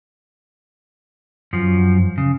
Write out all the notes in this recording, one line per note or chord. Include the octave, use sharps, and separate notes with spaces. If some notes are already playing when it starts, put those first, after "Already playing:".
F#2 F3
C#3